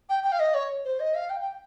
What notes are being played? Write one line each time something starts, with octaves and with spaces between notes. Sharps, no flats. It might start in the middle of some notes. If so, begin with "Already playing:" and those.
G5
G5
F5
D#5
C#5
C5
D#5
F5
G5
G5